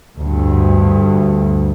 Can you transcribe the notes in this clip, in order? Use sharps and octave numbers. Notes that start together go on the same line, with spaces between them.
D2 G2